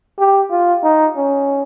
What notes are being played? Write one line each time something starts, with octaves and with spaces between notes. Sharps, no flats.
G4
F4
D#4
C#4